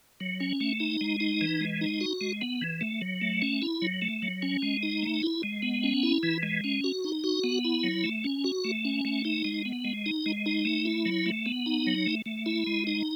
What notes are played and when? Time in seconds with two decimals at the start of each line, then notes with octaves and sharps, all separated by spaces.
0.20 F#3
0.40 C#4
0.60 A3
0.80 D#4
1.01 G#3
1.20 D#4
1.41 E3
1.61 G#3
1.81 D#4
2.01 F#4
2.21 G#3
2.41 B3
2.62 E3
2.81 A3
3.01 F#3
3.21 A3
3.42 C#4
3.62 E4
3.82 F#3
4.02 A3
4.22 F#3
4.42 C#4
4.62 G#3
4.83 D#4
5.02 A3
5.23 E4
5.43 G#3
5.62 B3
5.83 C#4
6.03 E4
6.23 E3
6.43 G#3
6.64 C#4
6.84 F#4
7.04 D#4
7.24 F#4
7.44 B3
7.64 E4
7.83 F#3
8.04 A3
8.24 C#4
8.44 F#4
8.64 A3
8.85 C#4
9.05 A3
9.25 D#4
9.45 G#3
9.65 B3
9.85 G#3
10.06 D#4
10.26 G#3
10.46 D#4
10.65 A3
10.85 E4
11.06 F#3
11.26 A3
11.46 B3
11.66 D#4
11.87 F#3
12.06 A3
12.26 A3
12.46 E4
12.67 G#3
12.87 D#4